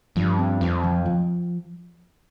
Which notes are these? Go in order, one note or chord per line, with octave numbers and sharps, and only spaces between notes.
G2 F3
C4
F2 C4
F3
F3